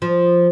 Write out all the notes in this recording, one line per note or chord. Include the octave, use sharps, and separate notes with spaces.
F3